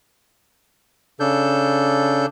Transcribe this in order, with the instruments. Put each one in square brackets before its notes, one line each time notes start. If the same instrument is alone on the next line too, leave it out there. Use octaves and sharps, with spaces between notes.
[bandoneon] C#3 D4 A4 G6